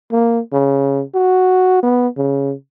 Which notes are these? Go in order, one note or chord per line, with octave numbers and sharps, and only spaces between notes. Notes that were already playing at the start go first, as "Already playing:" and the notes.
A#3
C#3
F#4
B3
C#3